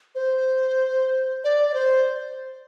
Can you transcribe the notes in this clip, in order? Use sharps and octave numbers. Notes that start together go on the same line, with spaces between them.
C5
D5
D5
C5